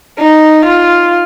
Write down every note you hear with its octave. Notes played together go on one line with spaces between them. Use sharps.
D#4
F4